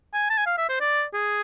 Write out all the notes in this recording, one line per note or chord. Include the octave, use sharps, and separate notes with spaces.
G#5
A5
G#5
F5
E5
C5
D5
G#4